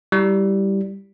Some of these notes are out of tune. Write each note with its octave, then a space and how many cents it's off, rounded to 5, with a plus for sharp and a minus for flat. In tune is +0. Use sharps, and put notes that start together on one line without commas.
G3 -5 E4 +5